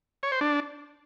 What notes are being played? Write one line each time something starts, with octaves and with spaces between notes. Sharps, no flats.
C#5
C5
D4